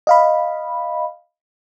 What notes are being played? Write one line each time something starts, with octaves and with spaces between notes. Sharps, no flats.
D#5 F5 B5